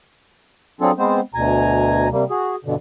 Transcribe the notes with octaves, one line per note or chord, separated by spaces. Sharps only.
F#3 C4 D4 F4 G#4 A4
G#3 B3 C4 C5
D2 B2 G#5 A#5
C3 G3 A#3
F#4 G#4
G2 B2 D3